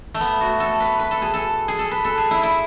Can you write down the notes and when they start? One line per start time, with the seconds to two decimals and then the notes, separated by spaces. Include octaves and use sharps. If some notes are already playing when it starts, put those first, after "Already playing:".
0.14 A3
0.21 B3
0.40 F#4
0.60 A4
0.80 B4
1.00 B4
1.11 A4
1.22 G#4
1.34 A4
1.68 G#4
1.79 A4
1.91 B4
2.05 A4
2.18 G#4
2.31 E4
2.43 E4